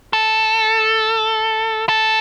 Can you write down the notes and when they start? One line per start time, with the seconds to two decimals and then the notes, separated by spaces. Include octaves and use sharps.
0.13 A4
1.89 A4